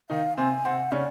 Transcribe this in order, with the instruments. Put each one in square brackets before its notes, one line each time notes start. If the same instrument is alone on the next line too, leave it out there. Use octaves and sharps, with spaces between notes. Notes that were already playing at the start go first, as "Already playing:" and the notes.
[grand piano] D#3 D#4 [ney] F5
[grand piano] C3 C4 [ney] G#5
[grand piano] C3 C4 [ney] F#5
[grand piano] C#3 C#4 [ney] D5